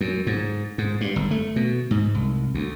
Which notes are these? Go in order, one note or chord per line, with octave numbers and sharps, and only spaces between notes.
F#2
G#2
G#2
G2
G1
A3
B2
G#2
C2
D2